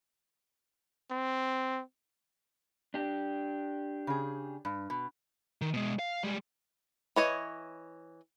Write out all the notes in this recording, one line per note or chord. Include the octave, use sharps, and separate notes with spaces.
C4
D4 G4
C#3 G#4
G2
B2
D#3
B2 G#3
F5
G3 G#3
E3 C#5 D#5